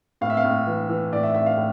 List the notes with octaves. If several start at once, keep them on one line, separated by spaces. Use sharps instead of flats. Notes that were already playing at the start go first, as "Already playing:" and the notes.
A2 F5
E5
F5
A2
E3
E3
A2 D5
E5
A2 E5
F5
A2